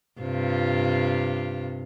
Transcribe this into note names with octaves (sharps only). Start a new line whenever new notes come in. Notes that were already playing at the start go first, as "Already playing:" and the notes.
G2 C3 F4